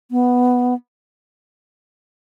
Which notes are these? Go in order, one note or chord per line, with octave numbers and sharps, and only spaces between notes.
B3